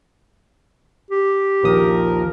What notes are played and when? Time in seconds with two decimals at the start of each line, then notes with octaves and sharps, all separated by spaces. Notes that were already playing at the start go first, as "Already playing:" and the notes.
1.10 G4
1.63 A#1 D#2 F3 A#4 D#6